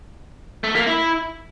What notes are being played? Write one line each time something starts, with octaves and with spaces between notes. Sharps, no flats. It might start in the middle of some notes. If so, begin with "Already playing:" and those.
A3
A#3
E4